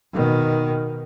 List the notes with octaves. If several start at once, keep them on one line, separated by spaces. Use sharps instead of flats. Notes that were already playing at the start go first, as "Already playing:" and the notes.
B2 D#3